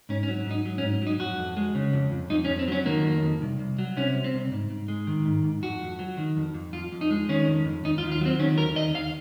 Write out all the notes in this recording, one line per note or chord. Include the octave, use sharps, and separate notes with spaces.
G#2 C#4
C#4
F#3
G#2 D#4
F#3
C#4
G#2
F#3 D#4
F2 F#4
F2
G#3
C#3
F2
F2
F2 D#4
C#4
F2
C4
F#3 C#4
D#3 A#3
F2
F2
C2
C2
F#3
C3 C#4
C2
C4
C2
G#2
G#2
G#3
D#3
G#2
G#2
F2 F#4
F2
F#3
D#3
F2
F2
F2 F4
F2
D#4
G#3
D#3 C#4
F2
F2
D#2 D#4
F4
D#2
F4
F#3 C4
D#3 C#4
D#2 A#4
D#2 D#5
D#2 F5